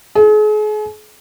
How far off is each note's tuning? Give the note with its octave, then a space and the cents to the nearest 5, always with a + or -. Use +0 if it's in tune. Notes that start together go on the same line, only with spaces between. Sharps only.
G#4 +40